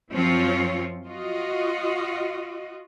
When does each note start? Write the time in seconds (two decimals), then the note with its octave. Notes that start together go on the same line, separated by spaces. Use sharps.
0.12 F#2 F3 C4 F4 C#5
1.07 F4 F#4 D#5